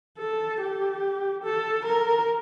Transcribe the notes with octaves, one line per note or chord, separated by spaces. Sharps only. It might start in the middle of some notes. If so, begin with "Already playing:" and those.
A4
G4
A4
A#4